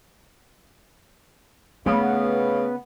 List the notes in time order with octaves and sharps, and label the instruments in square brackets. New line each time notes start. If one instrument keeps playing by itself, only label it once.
[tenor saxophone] C#3 [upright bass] A3 [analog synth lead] B3